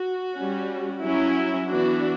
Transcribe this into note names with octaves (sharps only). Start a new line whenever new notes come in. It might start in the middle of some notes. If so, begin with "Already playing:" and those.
Already playing: F#4
G3 C#4
F#3 C#4 E4
E3 B3 D4 F#4